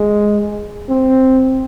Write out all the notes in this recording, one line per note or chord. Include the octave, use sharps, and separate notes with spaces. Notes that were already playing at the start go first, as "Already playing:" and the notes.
Already playing: G#3
C4